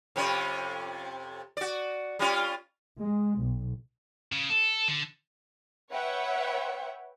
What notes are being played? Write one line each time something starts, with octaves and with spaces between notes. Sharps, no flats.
F2 C3 C#4
F#4 D5
G3 C#4 F4
G#3
B1
C#3
A4
D3
B4 C#5 E5 F#5 G5